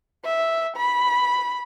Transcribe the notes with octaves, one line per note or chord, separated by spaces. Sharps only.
E5
B5